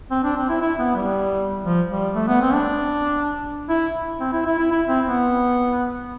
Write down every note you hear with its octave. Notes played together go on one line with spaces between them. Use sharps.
C4
D4
C4
E4
E4
B3
G3
F3
G3
A3
B3
C4
D4
E4
C4
E4
E4
E4
E4
C4
B3